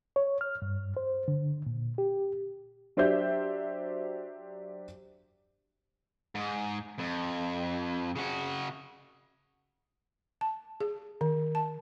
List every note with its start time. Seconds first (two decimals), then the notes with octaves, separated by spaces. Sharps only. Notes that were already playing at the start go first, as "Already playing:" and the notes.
0.16 C#5
0.41 F6
0.62 G2
0.97 C5
1.28 D3
1.67 A#2
1.98 G4
2.97 F#3 D4 G4 C5 E5 G6
6.35 G#2
6.98 F2
8.16 C#3 F#4
10.41 A5
10.81 G#4
11.21 D#3
11.55 A5